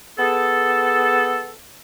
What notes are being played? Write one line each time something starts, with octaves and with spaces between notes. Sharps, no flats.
B3 G#4 A4